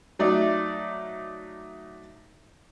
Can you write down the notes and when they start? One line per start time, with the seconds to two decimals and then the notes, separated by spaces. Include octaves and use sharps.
0.19 F#3 A3 D#4 D5